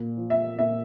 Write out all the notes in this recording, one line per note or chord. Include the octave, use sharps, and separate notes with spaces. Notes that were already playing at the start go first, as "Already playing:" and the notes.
Already playing: A#2
F3
E5
A#2 E5